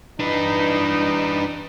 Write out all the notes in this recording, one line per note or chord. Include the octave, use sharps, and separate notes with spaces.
E3 D4 D#4 B4